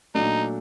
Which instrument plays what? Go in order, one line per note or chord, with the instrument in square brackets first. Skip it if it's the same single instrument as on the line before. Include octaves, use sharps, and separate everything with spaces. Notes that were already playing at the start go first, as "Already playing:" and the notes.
[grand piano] A#2 F#3 A3 D4 [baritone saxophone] D#4